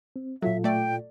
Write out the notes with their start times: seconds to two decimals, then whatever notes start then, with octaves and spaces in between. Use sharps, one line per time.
0.16 C4
0.42 A#2 F#3 F4 A4 E5
0.64 A3 D5 G5